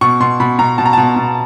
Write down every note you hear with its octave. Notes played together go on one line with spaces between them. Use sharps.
B2 C#6
B2 C6
B2 B5
B2 A#5
B2 A5
A#5
B2 A5
B2